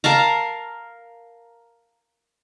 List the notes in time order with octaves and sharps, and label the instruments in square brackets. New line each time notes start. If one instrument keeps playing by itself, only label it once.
[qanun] A#4 F5 A5 A#5